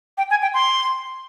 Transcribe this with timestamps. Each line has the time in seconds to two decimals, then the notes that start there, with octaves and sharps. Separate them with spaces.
0.18 G5
0.30 G#5
0.42 G5
0.54 C6